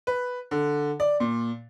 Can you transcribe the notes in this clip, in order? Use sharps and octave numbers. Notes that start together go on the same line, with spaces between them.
B4
D3
D5
A#2